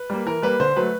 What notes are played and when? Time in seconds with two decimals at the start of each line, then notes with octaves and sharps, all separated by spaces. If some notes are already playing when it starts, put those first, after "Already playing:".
Already playing: B4
0.10 G3 A#3
0.26 E3 A#4
0.42 G3 A#3 B4
0.60 D3 C5
0.76 F#3 A3 B4